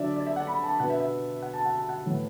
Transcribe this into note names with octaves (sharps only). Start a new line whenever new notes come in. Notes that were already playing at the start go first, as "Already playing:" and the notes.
Already playing: D3 F#3 D4 D5 E5
D5
E5
F#5
B5
A5
B2 B3 D4 F#5
E5
E5
F#5
A5
F#5
A5
F#5
A2 E3 B3